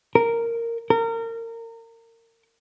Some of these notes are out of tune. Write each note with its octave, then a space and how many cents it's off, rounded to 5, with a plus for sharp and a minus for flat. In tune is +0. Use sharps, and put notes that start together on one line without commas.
A#4 -10
A#4 -30